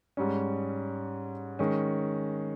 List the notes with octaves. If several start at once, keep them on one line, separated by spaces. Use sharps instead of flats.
G#2 G3 C#4
D#3 G#3 C#4